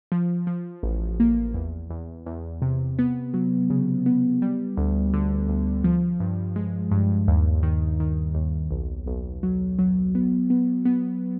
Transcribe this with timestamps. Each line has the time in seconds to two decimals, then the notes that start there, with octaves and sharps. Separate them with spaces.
0.12 F3
0.47 F3
0.83 A1
1.20 A#3
1.54 E2
1.90 E2
2.26 E2
2.62 C3
2.99 B3
3.34 F#3
3.70 C#3
4.06 B3
4.42 G3
4.77 D2
5.13 D3
5.49 D2
5.84 F3
6.20 G2
6.56 G#3
6.91 G2
7.28 D#2
7.63 D#3
8.00 D#3
8.35 D#2
8.71 B1
9.06 B1
9.43 F#3
9.79 F#3
10.15 B3
10.50 B3
10.85 B3